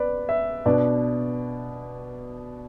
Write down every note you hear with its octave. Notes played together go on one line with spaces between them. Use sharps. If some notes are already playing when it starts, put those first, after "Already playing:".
Already playing: B3 B4 D5
E5
B2 B3 D4 D5